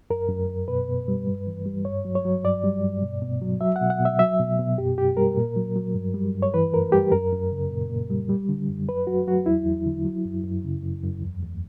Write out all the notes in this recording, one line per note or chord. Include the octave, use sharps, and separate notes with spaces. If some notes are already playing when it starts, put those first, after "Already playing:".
F#2 A#4
F#2
F#2
B2 B4
B2
G3
G2
E3
G3
G2 C#5
F#3
C#5
F#3
G2 D5
G3
G2
B2
B2
F#3
F#3 E5
F#5
B2
F#5
B2
E5
F#3 E5
B2
B2
F#2 G4
F#2 G4
G3 A#4
A#2
F#3
F#3
G2
G3
G2
C#5
E3 B4
F#2 A#4
G3 G4
F#2 A#4
F#2
C#3
A#2
A#2
G3
G3
D3
F#2
F#3 B4
F#3 F#4
F#3 F#4
E2 E4
E2
D3
F#3
F#2
F#2
C#3
F#2
F#2
E2
E2